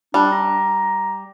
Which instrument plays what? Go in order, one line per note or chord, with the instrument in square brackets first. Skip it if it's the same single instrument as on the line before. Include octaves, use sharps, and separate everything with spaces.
[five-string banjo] G3 [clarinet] D4
[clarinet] A#5